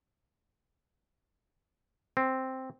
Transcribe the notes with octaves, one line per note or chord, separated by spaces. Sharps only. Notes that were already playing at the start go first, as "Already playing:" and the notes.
C4